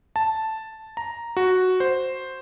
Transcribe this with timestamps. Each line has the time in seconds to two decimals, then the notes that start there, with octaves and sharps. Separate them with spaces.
0.16 A5
0.97 A#5
1.37 F#4
1.80 C5